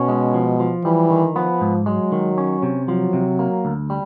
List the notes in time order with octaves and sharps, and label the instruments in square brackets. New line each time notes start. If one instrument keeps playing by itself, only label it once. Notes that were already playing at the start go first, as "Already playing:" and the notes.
Already playing: [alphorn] B2 [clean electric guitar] C#4
[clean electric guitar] G#3
F3
F3
[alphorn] E3 [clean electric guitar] G3
[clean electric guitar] D#3
[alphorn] F3 [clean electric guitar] B3
[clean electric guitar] G#2
[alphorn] F#3 [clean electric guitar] G#3
[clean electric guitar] D#3
C#4
C3
[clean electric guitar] F3 [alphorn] F#3
[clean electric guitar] C3
A#3
D2
G3